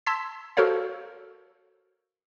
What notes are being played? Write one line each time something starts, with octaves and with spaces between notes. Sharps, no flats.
A5 C6 E6 G#6 B6
F#4 A4 A#4 C5 C#5 F5